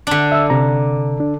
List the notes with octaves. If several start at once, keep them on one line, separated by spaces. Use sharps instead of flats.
D3 D4
E5 E6
C3 A#5
D4